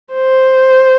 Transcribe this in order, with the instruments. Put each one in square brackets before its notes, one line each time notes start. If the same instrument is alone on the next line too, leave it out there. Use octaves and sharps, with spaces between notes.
[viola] C5